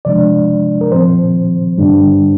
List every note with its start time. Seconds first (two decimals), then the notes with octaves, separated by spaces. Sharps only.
0.05 C3 F3 G#3 D4 D5
0.81 A#4
0.92 A#2 F3 C4 C5
1.78 G2 D3 G3 D4